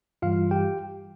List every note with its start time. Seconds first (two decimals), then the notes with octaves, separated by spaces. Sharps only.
0.22 G2 E3 G3 F4 F5
0.51 G4 G5